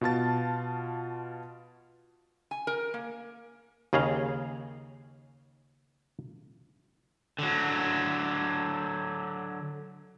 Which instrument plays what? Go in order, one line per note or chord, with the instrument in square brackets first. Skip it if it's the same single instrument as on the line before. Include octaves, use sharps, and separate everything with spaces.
[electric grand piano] B2 F4 A5 A6
[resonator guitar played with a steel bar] G#5
A#4
A#3
[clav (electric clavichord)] D#2 C#3 G#4 D#5 F5
[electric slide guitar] D3 F#3